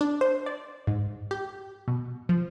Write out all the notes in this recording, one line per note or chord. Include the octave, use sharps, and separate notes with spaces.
D4
C5
D5
G#2
G4
B2
F3